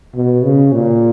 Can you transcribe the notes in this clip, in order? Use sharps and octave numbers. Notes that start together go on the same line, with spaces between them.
B2
C#3
A#2